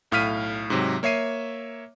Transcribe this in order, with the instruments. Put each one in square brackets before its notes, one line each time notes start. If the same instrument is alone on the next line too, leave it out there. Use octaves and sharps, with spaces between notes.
[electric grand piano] B1 A2 F5 F6 B6 D#7
G#2 C3 F#3
A#3 C#5 E5 C7 D#7